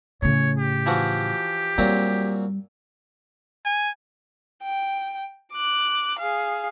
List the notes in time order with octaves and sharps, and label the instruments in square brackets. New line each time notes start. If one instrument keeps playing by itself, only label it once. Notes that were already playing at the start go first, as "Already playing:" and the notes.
[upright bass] A2 C#3 [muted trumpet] C#5
[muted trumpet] G4
[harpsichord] E3 F3 F#4
[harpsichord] A#2 F#3 C4 [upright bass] G3
[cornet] G#5
[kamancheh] G5
D6 F#6
G#4 F5